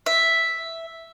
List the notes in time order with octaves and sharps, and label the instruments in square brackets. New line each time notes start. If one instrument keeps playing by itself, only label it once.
[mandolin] E5